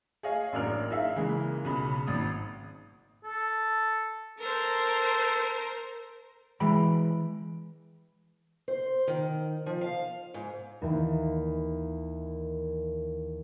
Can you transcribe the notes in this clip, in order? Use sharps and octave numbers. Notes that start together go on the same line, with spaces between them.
G#4 C#5 D#5 F5 G#5
A1 F#2 A#3 D4 A#4 F6
D#4 G#4 E5 F5
C#3 E3 G#3 A#3
B1 C#3 B5
G#1 D#4 D#6
A4
A4 A#4 C5
E3 G#3 G5 B5
C5
D#3
F3
F5
G#2
D#2 E3 A#3